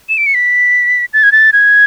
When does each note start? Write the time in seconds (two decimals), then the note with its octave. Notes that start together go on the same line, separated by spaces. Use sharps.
0.09 E7
0.18 D7
0.26 C#7
0.34 B6
1.13 A6
1.23 G#6
1.32 A6
1.53 G#6